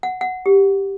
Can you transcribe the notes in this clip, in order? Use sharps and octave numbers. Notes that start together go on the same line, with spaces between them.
F#5
F#5
G4